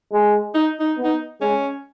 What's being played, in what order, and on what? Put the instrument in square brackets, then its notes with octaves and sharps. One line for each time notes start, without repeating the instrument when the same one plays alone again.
[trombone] G#3
[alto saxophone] D#4
D#4
[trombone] B3
[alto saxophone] D#4
[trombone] G#3 [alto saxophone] C#4